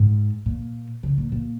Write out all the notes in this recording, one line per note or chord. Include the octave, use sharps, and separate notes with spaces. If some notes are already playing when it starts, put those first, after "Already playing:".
Already playing: G#2
A#2
C#3
A#2
A#2